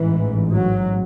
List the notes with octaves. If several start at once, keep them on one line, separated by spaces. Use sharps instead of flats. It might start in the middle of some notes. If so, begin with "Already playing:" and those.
Already playing: A1 G#2 E3
F#3